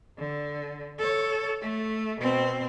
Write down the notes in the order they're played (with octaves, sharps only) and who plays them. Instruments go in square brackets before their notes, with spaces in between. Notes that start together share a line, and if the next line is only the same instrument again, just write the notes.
[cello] D3
A4 C#5
A3
B2 C4